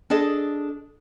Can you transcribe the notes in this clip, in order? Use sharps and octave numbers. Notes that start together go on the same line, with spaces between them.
D4 G#4 A4 D#5